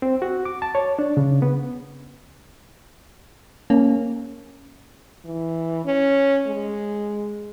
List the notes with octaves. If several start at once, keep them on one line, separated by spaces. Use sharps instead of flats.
C4
F#4
D6
A5
C#5
D4
C#3
B3
A#3 C#4
E3
C#4
G#3